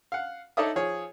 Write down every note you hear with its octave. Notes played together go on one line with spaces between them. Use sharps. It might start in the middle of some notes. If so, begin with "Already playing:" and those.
F5 F#5
D#4 A4 C#5 D5 E5 D#6
F3 G#4 C#5